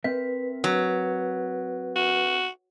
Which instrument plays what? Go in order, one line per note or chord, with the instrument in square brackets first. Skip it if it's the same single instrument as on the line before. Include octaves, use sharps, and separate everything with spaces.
[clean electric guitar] C4 A#4 E5 [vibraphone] B4
[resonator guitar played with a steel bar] F#3 [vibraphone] B4
[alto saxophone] F#4